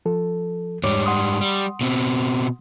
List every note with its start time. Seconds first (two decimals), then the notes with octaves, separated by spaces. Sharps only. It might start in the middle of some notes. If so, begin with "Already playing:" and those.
0.06 F3 A4
0.83 E2 G#2 G3 C#5 D6
1.06 F#5 C6 D#6
1.41 G3
1.81 B2 C4